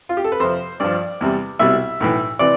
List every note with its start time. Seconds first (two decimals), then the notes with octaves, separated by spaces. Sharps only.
0.09 F4
0.17 G4
0.24 A4
0.32 B4
0.40 F2 C3 F3 C5
0.80 G2 F3 D5
1.21 E2 C3 G3
1.59 C2 B2 G3 E5
2.00 B1 A2 E3
2.39 C3 E3 D5